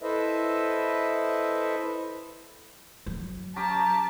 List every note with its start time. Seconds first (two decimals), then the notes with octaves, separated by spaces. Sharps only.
0.02 E4 A4 B4 C5 D#5 E5
3.06 F#3
3.56 C#4 G4 A5 A#5